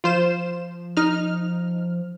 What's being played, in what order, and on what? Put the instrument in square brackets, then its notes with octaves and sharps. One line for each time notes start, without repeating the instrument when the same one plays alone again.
[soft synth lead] F3 [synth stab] F4 C5 E7
[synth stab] D#4 F6